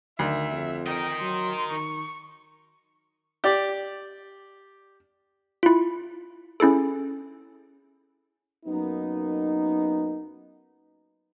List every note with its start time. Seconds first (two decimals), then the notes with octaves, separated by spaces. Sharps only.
0.19 D2 D#3 E5
0.52 F2
0.87 A#4 D#5 G5
1.21 F#3 C6
1.71 D#3 C#6
3.44 G4 D5
5.63 E4 F4
6.60 C#4 E4 G#4 A4
8.66 F#2 A#3 B3 D#4